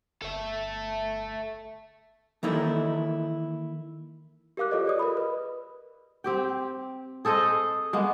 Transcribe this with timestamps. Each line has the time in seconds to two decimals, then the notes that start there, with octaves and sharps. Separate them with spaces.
0.22 G1 A4 E5
2.43 D#3 E3 A#3 D#4 E4 A4
4.57 G4 A#4 F5 D6 F#6
4.71 F4 G4 A4 B4 C#5 D#5
4.86 G#4 D5 D#6
4.99 A#4 D#5 B5
5.17 B4
6.24 C4 G4 G5
7.25 G#4 A4 C5 D#5
7.93 G#3 A#3 B3